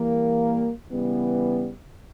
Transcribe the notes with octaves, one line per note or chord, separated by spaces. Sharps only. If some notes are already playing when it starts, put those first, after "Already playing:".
Already playing: E3 G3 A#3
C#3 E3 G3 B3